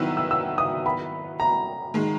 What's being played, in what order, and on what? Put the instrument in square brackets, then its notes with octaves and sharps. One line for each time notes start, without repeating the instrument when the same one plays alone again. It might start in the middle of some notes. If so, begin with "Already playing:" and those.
Already playing: [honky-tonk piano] D#3 F#3 B3 E4 B4 [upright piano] E6
[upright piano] E6
E6
D#6
B5
A#5
[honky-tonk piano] D#3 G#3